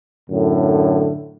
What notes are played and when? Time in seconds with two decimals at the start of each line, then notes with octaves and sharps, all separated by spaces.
0.30 F#2 A2 D3